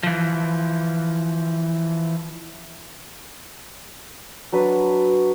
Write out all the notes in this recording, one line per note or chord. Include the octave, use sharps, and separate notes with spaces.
E3 F3
F#3 D4 B4